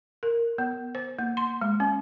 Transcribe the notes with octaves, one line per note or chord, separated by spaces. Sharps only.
A#4
B3
C5
A#3
C6
G#3
C#4